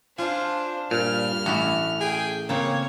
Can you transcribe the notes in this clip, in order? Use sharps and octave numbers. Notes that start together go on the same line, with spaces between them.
D4 F4 C5 G#5
G2 A#2 F6
A1 A3 E4 F#4
G#4 G5
C#3 A#3 C4 C#5